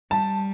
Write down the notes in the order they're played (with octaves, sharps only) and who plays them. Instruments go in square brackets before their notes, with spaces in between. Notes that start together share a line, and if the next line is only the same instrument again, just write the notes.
[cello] G3 [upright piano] A5